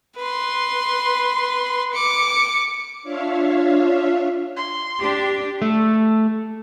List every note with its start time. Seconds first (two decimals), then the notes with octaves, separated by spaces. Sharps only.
0.18 B4 C6
1.94 D6 C#7
3.03 D4 F4 C#5 E5 F5
4.57 C6
5.00 D4 G4
5.62 A3